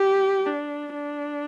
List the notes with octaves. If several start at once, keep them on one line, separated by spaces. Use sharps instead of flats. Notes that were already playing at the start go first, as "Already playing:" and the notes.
Already playing: G4
D4
D4